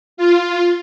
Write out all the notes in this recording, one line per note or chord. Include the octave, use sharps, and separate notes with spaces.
F4